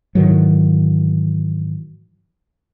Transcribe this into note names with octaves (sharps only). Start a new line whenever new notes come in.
G#2 D#3 E3 F#3